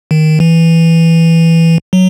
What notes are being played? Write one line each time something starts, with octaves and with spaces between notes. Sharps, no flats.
D#3
E3
F#3